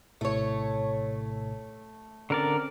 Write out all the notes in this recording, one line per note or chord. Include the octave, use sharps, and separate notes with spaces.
A#1 A2 C3 A3 C#5
D3 C4 C#4 A#4 D5